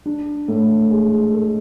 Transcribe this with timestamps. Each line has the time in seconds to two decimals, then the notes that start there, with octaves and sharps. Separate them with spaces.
0.06 D4
0.48 A2
0.91 G#3
1.33 A4